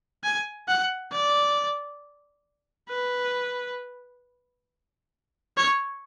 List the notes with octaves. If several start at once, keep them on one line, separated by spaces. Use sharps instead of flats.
G#5
F#5
D5
B4
C#5